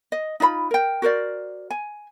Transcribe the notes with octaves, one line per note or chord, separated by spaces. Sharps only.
D#5
D#4 F4 E5 B5
A#4 G5
F#4 A#4 C5 D5
G#5